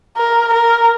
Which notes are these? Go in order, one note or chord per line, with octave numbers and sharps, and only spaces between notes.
A#4
A#4